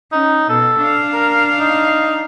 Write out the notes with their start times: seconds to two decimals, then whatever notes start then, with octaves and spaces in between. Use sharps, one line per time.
0.12 C#4 D#4
0.50 B2 A4
0.80 D4 F5
1.13 A#4
1.60 D#4